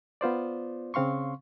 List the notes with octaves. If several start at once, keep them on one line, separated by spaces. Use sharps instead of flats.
B3 F4 C5 D5
C#3 C4 F5 C6 C#6